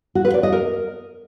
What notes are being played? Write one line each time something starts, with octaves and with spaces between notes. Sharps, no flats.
F#4
B4
D5
D#5
A#4